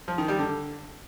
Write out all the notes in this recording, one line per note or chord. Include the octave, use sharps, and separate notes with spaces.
F3
D#3
G3
D3